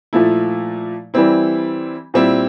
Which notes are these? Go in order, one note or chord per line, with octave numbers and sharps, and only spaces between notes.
A#2 F3 A3 E4
E3 G3 C4 E4
A#2 G3 C4 E4